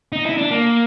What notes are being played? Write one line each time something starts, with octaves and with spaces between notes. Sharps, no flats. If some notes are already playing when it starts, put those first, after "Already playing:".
D#4
E4
D4
A#3